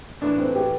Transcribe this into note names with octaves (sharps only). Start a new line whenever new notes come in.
A2 E3 A#3 D4
C4
G4